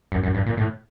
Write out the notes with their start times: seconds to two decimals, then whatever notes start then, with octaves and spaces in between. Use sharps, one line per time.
0.12 F#2
0.23 F#2
0.34 G2
0.46 A#2
0.57 A2